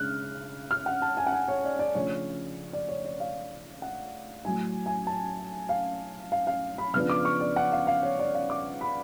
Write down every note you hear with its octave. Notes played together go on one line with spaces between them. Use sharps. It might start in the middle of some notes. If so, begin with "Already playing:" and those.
Already playing: C#3 G#3 D4 F6 F#6
F6
F#5
A5
G#5
F#5
G#5
C#5
D5
D5
C#3 F3 A3 D4 C#5
D5
C#5
D5
F5
F#5
A2 F#3 A3 G#5
G#5
A5
F5
F5
F5
B5
C#3 F3 B3 D4 F6
D6
C#6
D5
F#5
F5
F5
C#5
D5
F5
D6
B5